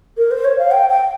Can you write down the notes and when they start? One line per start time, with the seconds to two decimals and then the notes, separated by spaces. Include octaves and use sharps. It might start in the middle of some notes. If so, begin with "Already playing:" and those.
0.17 A#4
0.31 C5
0.45 C#5
0.58 F5
0.71 G5
0.89 G5